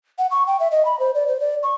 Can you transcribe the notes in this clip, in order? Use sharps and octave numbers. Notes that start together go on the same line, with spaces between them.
F#5
C#6
G5
E5
D#5
B5
C5
D5
C5
D5
C#6